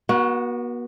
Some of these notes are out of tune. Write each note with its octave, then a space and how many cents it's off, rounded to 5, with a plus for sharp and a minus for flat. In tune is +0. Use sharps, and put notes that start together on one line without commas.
B3 -45 F#4 +0